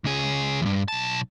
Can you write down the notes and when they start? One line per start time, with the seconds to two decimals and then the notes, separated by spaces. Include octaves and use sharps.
0.04 C#2 G#4
0.62 E2 G2
0.88 B1 A5